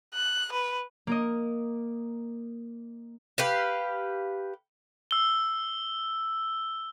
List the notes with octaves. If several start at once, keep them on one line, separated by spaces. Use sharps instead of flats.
F#6
B4
A#3 A#4 D#5
G4 B4 F5
E6 G7